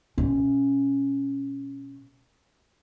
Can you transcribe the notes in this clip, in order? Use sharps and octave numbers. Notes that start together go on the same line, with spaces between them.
B2 C#4